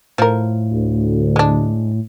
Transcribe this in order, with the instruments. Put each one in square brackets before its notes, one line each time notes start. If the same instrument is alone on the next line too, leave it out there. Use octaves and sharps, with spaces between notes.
[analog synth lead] A2 [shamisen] F3 A#4
[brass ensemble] D2
[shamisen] G#3 D4